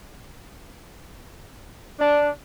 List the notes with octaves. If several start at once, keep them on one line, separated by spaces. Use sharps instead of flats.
D4